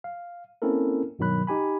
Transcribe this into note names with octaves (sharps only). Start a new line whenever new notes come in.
F5
A#3 C4 C#4 E4 A4 A#4
G2 B2 D#3 F#3 B5 F#6
D#4 G4 G#5 B5